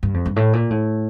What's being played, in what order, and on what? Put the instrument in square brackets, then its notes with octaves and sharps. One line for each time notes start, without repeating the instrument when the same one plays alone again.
[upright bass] G2
F2
G2
A2
A#2
A2